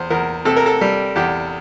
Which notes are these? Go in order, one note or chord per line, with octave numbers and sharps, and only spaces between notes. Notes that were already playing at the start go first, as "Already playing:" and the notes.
Already playing: E2 C5
E2 A#4
C3 A4
A#4
A4
G3
E2 G4